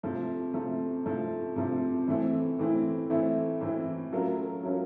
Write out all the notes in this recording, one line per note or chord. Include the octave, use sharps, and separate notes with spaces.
C3 F3 A3
C3 F3 A3
C3 F3 A3
C3 F3 A3
A2 E3 A3 C4 E4
A2 E3 A3 C4 E4
A2 E3 A3 C4 E4
A2 E3 A3 C4 E4
F#3 A3 C#4 F4 A#4
F#3 A3 C#4 F4 A#4